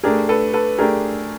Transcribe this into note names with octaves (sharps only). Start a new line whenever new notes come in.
A3 D4 G4 G#4 A#4
A4 B4
A4 B4
A3 D4 G4 G#4 A#4